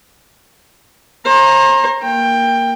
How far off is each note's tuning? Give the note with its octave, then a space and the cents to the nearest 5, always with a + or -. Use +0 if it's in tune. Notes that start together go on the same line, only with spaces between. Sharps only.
C5 +45 A#5 +0
A#3 +0 G5 +15